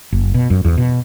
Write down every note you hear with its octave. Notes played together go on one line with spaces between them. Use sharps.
F#1
B2
F#2
E2
B2